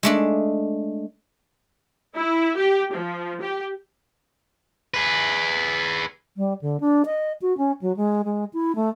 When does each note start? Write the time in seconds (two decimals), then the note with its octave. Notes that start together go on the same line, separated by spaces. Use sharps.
0.03 G#3 A3 D4
2.15 E4
2.56 G4
2.94 F3
3.41 G4
4.94 G#4 B4
6.37 G3
6.61 D3
6.80 D4
7.05 D#5
7.42 F#4
7.58 C#4
7.82 F#3
7.97 G#3
8.25 G#3
8.53 E4
8.76 A3